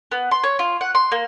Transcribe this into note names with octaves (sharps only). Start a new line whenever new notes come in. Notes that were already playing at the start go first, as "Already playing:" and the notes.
B3
C6
C#5
F4
F#5
C6
A#3